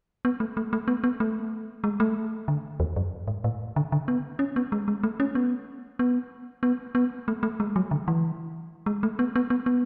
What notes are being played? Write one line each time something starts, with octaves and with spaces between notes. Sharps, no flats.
B3
A3
A3
A3
B3
B3
A3
G#3
A3
D3
E2
F#2
G#2
A2
D3
D3
B3
C#4
B3
G#3
G#3
A3
C#4
B3
B3
B3
B3
A3
A3
G#3
F#3
D3
E3
G#3
A3
B3
B3
B3
B3